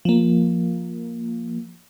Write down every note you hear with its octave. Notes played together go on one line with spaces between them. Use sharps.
F3 A#3